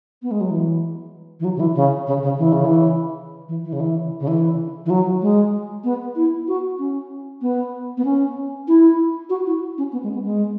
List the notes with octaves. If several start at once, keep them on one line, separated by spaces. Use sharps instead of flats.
B3
G#3
F#3
E3
E3
F#3
C#3
E3
C#3
C#3
C#3
E3
C#3
E3
E3
E3
C#3
E3
C#3
E3
E3
F#3
G#3
B3
E4
F#4
C#4
B3
B3
C#4
E4
F#4
E4
C#4
B3
G#3
B3
G#3